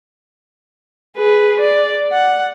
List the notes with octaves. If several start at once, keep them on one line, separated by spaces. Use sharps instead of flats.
G#4 B4
D5
F#5